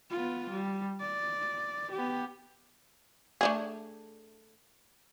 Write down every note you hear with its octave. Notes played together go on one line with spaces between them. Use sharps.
B3 F4
G3
D5
B3 G4
A3 D4 G#4